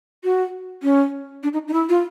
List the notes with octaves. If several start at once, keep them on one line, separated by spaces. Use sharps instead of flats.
F#4
C#4
D4
D#4
D#4
E4
F4